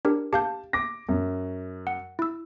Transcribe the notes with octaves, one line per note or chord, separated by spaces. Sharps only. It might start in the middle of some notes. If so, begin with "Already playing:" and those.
D4 G4 A#4
G4 F5 A5 G6
D6 A#6
F#2
F#5
E4 E6